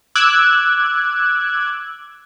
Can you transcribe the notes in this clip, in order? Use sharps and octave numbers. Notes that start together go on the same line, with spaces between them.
D6 E6 F#6 G#6